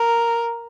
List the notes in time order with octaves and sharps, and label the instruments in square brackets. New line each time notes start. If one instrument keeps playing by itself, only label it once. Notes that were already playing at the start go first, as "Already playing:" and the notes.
Already playing: [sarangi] A#4